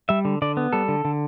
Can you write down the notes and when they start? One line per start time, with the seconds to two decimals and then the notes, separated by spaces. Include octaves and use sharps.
0.09 G3 E5
0.25 D3
0.42 D3 D5
0.57 B3
0.73 G3 A4
0.88 D3
1.05 D3